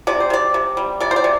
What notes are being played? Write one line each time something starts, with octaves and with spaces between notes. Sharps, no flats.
C3 D5
C5
C3 D5
C3
G3
C3 D5
C5
D5
C3